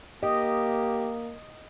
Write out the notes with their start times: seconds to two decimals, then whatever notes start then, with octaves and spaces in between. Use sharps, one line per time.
0.23 A#3 G4 D#5